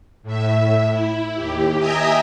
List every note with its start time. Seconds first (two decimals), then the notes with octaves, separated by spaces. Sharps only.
0.23 A2 E5
0.89 E4
1.35 D#2 G4
1.79 D#5 E5 G5 G#5 A#5 D#6